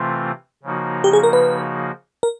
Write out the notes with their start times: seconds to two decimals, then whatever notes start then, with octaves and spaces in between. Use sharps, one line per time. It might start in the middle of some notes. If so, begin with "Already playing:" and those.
Already playing: C3 E3 A3 C4 F4
0.63 C#3 F3 A#3 D#4 F#4
1.04 G4
1.13 G#4
1.23 A#4
1.33 B4
2.23 A#4